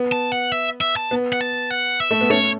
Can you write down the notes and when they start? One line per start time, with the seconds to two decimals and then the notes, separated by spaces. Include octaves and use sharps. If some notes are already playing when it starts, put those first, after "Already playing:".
Already playing: B3
0.12 A5
0.32 F#5
0.52 E5
0.81 E5
0.96 A5
1.11 B3
1.33 F#5
1.41 A5
1.71 F#5
2.00 E5
2.11 A3
2.21 B3
2.30 A3 C#4 C#5